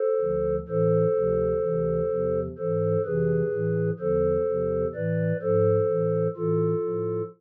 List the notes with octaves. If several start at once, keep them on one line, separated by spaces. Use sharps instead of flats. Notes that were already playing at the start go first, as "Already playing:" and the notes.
Already playing: A4 C5
D2 D3 F3
A2 E3 A4 C5
D2 C3 F3
D2 C3 E3
E2 C3 F3
G#2 E3 A4 C5
F2 C3 E3 G#4 B4
A2 E3
E2 D3 F3 A4 C5
E2 C3 F3
A2 E3 B4 D5
G#2 F3 A4 C5
A2 E3
A2 E3 F4 A4
A2 F3